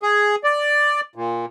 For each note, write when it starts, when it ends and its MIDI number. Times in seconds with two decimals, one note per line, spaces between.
0.03 0.35 68
0.44 1.01 74
1.16 1.46 46